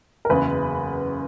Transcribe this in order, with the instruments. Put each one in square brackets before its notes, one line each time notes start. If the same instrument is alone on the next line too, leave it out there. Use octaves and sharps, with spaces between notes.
[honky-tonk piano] A#4
[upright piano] F#1 E2 C#3 [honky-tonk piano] B4